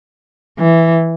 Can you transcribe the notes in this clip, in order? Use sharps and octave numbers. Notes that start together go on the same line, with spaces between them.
E3